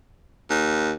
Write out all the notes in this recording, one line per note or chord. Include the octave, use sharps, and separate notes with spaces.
D#2